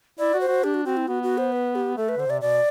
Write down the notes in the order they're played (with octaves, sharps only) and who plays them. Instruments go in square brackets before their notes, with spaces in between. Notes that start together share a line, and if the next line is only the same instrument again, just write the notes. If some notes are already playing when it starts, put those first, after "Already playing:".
[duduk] E4 [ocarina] D5
[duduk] F#4
[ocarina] C5
[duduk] F#4
[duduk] D4 [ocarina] G4
[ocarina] F#4
[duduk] C4 [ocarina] F#4
[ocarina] E4
[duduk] B3 [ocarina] F#4
[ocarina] F#4
C5
B4
G4
[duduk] A3 [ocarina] A4
[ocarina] B4
[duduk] D3 [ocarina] C5
[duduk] C3 [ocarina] D5
[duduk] B2 [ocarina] D5